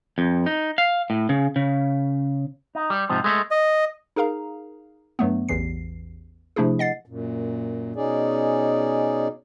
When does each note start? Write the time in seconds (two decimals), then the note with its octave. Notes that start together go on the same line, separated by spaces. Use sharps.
0.18 F2
0.46 D#4
0.78 F5
1.10 A2
1.29 C#3
1.56 C#3
2.75 D#4
2.90 G3
3.09 G#2 C3 F3
3.24 G#3 A3
3.51 D#5
4.16 D#4 G#4 A#4 F5 A#5
5.19 G2 F#3 A3 B3
5.49 A1 E2 E3 C7
6.56 C3 F3 A3 D4 E4 G#4
6.79 D#5 F#5 A6 C7
7.06 F#2 A#2
7.96 B2 C#4 D#4 G#4 D5